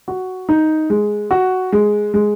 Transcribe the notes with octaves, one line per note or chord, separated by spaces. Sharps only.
F#4
D#4
G#3
F#4
G#3
G#3